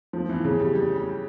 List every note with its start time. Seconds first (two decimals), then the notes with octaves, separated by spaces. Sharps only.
0.13 F3
0.29 E3
0.45 C#3
0.60 G3
0.75 G3
0.96 G3